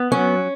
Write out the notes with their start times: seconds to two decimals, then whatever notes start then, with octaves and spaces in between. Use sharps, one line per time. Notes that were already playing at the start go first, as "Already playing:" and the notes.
Already playing: B3
0.11 F#3 C#4